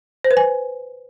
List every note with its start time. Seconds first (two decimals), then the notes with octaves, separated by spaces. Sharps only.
0.24 C5
0.31 B4
0.37 G#5